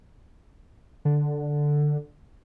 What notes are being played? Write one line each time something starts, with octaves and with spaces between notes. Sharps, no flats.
D3